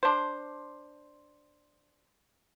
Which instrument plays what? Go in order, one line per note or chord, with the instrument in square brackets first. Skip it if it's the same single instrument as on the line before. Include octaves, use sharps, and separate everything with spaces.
[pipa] D4 C5